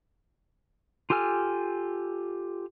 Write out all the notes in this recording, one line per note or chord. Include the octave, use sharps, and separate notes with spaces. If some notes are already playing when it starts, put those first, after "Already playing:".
F4 G4 A4 G#5 F6